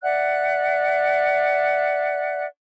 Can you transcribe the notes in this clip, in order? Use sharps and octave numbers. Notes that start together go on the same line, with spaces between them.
D5 E5 F#5 F#6